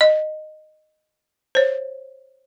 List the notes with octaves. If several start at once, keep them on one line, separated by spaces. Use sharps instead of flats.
D#5
C5 C#5